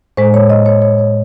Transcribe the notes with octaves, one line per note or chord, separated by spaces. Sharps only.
A2 G#3 C5
C#5
D#5
C#5
C#5
C#5